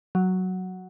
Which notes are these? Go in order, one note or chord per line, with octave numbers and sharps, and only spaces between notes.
F#3